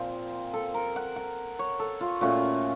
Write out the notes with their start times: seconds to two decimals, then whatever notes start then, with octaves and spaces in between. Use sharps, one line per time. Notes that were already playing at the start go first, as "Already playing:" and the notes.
Already playing: A#2 F3 C4 F4
0.53 A4
0.74 A#4
0.96 F#5
1.16 F#5
1.59 C#5
1.79 A4
2.01 F4
2.21 A#2 A3 C#4 F4 F#4